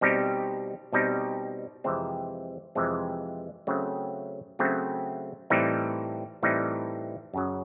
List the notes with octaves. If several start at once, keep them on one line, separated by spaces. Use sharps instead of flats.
B2 G3 C4 D#4 G4
B2 G3 C4 D#4 G4
F2 C3 E3 G#3 C4
F2 C3 E3 G#3 C4
C#3 F#3 A3 C4
C#3 F#3 A3 C4
A2 E3 G3 C4 D#4
A2 E3 G3 C4 D#4
F#2 C#3 F#3